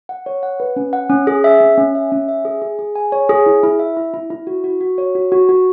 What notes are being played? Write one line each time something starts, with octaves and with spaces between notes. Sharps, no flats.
F#5
C#5
F#5
B4
C#4
F#5
C#4
G#4
E5
C#4
C#4
E5
C#4
E5
G#4
G#4
G#4
G#5
C#5
G#4
E4
E4
E5
E4
E4
E4
F#4
F#4
F#4
C#5
F#4
F#4
F#4